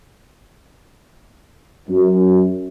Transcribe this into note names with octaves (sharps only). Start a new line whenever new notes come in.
F#2